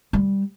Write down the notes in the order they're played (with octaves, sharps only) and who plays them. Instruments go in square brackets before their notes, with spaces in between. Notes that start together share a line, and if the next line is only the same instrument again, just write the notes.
[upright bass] G3